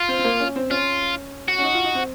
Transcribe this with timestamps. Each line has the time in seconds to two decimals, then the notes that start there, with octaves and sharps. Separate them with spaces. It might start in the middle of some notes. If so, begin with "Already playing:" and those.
Already playing: F4
0.08 C4
0.19 C4
0.25 A#3
0.40 C#4
0.56 C4
0.70 C#4 F4
1.48 F#4
1.58 C#4
1.63 D#4
1.74 F4
1.84 D#4
1.95 C4